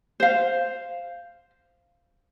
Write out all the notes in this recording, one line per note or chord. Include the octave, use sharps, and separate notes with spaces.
C5 F5